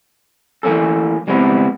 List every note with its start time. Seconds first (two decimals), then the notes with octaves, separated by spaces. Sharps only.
0.63 E3 A3 A#3 C#4 A4
1.27 C#3 G3 G#3 B3 C4 E4